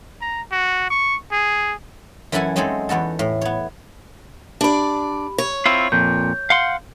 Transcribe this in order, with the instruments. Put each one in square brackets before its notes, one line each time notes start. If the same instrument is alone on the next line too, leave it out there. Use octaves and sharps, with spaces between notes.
[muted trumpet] A#5
F#4
C#6
G#4
[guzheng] F#2 E3 E4 A4 F#5 G#5
F#3 G#3 C4 D#4 G#4 A4
E2 B3 F#4 A4
A2
B3 C#5
[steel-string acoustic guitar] D4 D5 [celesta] G4 B5
[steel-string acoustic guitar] C#5
[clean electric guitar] C4 E4 F4
[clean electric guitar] F2 A#2 [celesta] G6
[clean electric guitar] F5 F#5 C6